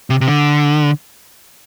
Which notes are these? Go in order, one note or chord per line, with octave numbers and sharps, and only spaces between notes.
C3
C3
D3